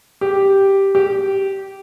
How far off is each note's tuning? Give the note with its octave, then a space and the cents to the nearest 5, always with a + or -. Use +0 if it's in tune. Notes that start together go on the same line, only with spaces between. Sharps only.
G4 -5
G4 -15